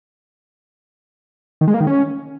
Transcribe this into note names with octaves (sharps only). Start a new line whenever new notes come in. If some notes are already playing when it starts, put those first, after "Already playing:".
D#3
G#3
A#3
D#3
C#4